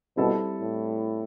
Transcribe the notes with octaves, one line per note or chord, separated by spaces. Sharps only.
B2 G3 C4 E4 A4
A2